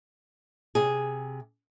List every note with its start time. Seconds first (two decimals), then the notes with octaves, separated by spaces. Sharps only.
0.75 C3 G#4